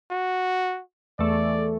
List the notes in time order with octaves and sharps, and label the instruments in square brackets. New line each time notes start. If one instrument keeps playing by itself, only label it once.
[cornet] F#4
[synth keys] E2 A3 [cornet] D5